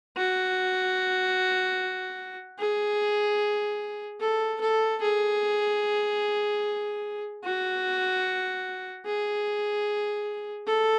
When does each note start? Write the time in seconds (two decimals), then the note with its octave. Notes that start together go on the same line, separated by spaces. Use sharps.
0.17 F#4
2.59 G#4
4.21 A4
4.61 A4
5.02 G#4
7.44 F#4
9.05 G#4
10.67 A4